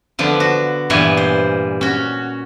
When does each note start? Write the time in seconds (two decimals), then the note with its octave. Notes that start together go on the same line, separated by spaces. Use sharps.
0.19 D3 F3 B3
0.40 F#4
0.90 G2 A#2 E3 B3 C#5 G#5
1.17 C5
1.81 C#4 F#4